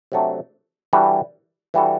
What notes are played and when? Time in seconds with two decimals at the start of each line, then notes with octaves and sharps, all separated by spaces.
0.12 C3 F#3 A3 D4
0.93 E3 G3 D4 F#4 A4
1.74 E3 G3 D4 F#4 A4